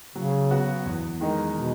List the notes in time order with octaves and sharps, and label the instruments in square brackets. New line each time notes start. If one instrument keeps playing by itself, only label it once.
[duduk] C#3 [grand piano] F#3
[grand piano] B3 F#4
E2
D#3 G#3 D#4 A#4
[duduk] B2